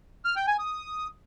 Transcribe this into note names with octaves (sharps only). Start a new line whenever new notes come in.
F6
G5
G#5
D#6